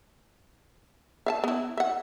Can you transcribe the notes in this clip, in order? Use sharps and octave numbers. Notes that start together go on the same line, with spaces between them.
E5 F5 A5
B3 E4
E5 F#5